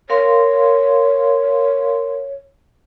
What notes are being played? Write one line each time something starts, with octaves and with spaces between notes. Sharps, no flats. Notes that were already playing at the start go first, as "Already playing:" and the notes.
A#4 C#5 F5 C6